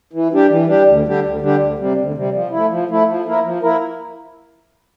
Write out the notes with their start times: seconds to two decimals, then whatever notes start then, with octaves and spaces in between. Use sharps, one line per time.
0.13 E3
0.31 G3 D4 G4
0.50 E3
0.68 G3 D4 G4
0.87 D2
1.05 D3 G3 D4 G4
1.23 D2
1.41 D3 G3 D4 G4
1.59 D2
1.79 C3 G3
1.97 D2
2.14 C3 G3
2.33 F3
2.51 E4
2.56 A3
2.70 F3
2.89 A3 E4
3.07 F3
3.26 A#3 E4 A#4
3.44 F3
3.62 A#3 E4 A#4